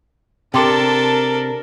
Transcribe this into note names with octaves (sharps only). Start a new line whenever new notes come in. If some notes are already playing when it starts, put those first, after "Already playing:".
C3 D4 A4 A#4 G5 C6 D6